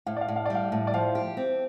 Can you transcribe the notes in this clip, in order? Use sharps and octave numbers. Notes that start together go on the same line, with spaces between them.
A2 F5
D5
F5
A2
F5
G3 D5
F5
A2
D5
F3 F5
G4
C4